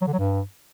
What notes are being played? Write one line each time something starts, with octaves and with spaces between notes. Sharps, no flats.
F#3
D3
F#3
G2